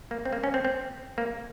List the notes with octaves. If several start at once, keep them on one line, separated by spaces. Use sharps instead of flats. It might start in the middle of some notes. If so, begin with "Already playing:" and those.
A#3
C4
A#3
C#4
C4
C4
A#3